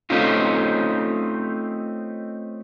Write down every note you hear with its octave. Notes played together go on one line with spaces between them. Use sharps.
A3 C4 C#4 D#4 F4